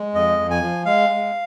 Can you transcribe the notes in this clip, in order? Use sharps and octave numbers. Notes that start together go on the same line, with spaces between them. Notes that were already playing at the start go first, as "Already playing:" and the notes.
Already playing: G#3
F2 D#5
F2
G#5
F3
G#3 F5
G#3